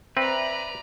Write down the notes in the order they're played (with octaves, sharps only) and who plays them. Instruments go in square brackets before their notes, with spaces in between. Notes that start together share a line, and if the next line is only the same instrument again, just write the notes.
[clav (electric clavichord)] C4 [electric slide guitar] B4 [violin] D5 A#5 [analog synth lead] E5